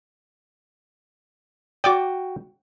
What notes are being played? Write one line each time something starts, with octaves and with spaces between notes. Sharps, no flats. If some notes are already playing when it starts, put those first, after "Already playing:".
F#4 D5 G5 D6